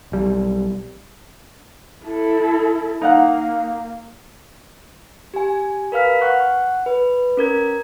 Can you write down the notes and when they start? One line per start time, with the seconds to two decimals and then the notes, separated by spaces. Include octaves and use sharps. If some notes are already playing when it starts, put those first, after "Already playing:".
0.12 B1 G3
2.05 E4 A4
3.02 A#3 D#4 F5 F#5
5.34 G4 G#5
5.92 A#4 B4 F5 F6 B6
6.21 F#5 C#6 F#6
6.86 B4
7.37 C#4 A#4 G#6